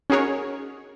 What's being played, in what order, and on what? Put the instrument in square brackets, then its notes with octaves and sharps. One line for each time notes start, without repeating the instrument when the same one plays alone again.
[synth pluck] C#4 D#4 F#4 G#4 A#4 C#5